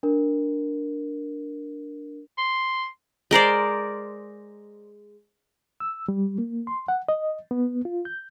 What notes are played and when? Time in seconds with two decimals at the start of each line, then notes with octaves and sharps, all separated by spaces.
0.03 D4 A#4
2.38 C6
3.31 G#3 A#4 C5 D5
5.80 E6
6.09 G3
6.38 A#3
6.67 C6
6.88 F#5
7.09 D#5
7.51 B3
7.85 F4
8.05 G6